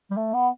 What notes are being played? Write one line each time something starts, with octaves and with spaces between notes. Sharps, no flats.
G3
A3
B3